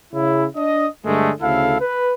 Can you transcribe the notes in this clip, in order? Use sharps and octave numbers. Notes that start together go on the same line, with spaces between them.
C#3 E4
D4 D#5
G2 D3 G#3 A3
D2 C#3 E4 A4 F5
B4